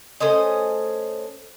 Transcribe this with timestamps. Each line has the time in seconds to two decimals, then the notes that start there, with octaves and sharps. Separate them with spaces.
0.20 A3 C#4 C5 D#5